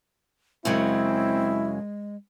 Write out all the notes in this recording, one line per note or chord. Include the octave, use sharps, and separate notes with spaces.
F#2 C#3 F#3 G#3 C4 E4